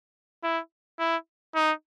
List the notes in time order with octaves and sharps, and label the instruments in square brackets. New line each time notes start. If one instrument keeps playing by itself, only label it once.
[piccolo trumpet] E4
E4
D#4